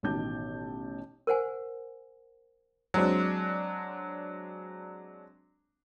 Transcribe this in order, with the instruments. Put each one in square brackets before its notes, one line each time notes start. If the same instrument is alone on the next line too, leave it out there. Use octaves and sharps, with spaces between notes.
[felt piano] A1 B2 D#3 A5 D6 G6
[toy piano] A#4 C5 F#5 G#5
[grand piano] F#3 G#3 C4 D4